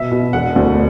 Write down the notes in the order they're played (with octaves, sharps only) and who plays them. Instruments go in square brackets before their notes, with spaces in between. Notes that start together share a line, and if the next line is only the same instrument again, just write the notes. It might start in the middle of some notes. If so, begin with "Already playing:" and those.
Already playing: [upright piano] B2 E5
B2
E1 F#5
D2